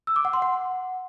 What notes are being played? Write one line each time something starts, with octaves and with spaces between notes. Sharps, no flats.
E6
D6
F#5
C6
F#5